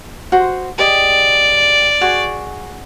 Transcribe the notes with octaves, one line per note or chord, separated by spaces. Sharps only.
F#4 C5 C6
G4 G#4 D5 D#5
F#4 G#4 C#6